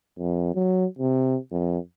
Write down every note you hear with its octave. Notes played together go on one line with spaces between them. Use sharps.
F2
F#3
C3
F2